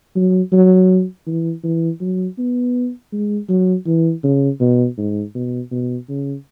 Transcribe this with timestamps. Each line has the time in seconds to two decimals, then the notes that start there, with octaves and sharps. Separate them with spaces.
0.16 F#3
0.52 F#3
1.27 E3
1.64 E3
2.00 F#3
2.38 B3
3.12 G#3
3.49 F#3
3.86 E3
4.23 C#3
4.60 B2
4.97 G#2
5.34 B2
5.71 B2
6.09 C#3